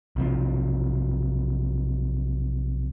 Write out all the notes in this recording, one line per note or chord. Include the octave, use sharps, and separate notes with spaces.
B1 C3 F3